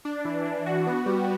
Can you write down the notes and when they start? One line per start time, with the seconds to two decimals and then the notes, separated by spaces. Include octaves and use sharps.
0.05 D4
0.25 E3
0.46 D4
0.66 F#4
0.86 B3
1.06 G3